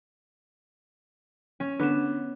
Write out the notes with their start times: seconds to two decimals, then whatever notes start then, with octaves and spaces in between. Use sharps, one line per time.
1.60 C#4
1.79 D3 B3 E7